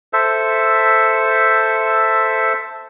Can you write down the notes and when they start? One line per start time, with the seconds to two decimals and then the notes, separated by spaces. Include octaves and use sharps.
0.13 A4 C5 E5